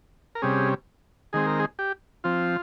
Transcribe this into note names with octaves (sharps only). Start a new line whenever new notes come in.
A#4
C3 G3 C#4 G#4
D#3 G#3 C4 G#4
A#4
G#4
G4
F3 C4 F4